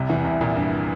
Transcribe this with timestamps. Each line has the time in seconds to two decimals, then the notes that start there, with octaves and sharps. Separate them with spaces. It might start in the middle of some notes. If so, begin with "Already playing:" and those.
Already playing: C2 C3
0.09 E2 E3
0.24 C2 C3
0.41 A#1 A#2
0.56 G2